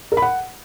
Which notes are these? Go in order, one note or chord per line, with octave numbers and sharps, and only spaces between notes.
A#4
B5
F#5